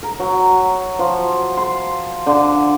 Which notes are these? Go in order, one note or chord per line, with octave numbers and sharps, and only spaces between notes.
A#4
F#3
F3
C6
D3